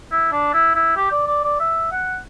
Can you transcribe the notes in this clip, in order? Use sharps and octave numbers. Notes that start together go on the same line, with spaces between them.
E4
D4
E4
E4
G4
D5
D5
D5
E5
F#5